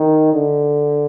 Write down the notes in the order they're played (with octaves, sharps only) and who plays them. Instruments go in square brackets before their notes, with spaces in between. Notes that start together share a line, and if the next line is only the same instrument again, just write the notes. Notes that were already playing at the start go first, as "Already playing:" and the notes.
Already playing: [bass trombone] D#3
D3